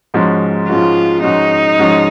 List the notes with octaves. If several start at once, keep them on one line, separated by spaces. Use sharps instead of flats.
G#2 F3 G#3 C#4 F#4
G#2 F3 G#3 C#4 F4 F#4
G#2 F3 G#3 C#4 D#4 F#4
G#2 F3 G#3 C#4 F#4